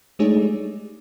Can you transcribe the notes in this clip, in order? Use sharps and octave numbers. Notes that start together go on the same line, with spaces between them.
G#3 A3 D4 D#4 G#4 C#5
G3